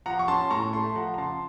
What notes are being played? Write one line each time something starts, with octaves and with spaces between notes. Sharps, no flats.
F3 F#5 A#5
C#6
C#4 A5 C6
A2 A#5 C#6
A3 A5 C6
F3 F#5 A#5
A#5
C#3 A5 C6